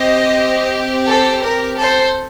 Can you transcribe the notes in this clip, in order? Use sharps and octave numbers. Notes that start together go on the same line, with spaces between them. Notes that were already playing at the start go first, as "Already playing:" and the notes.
Already playing: C4 G4 C5 D#5
A4 C5
A#4
A4 C5